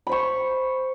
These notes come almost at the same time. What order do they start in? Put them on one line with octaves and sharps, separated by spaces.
B5 C5 C#6